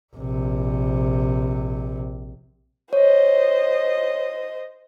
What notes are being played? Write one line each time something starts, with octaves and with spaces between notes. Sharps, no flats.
A#1 C3
C5 C#5 D#5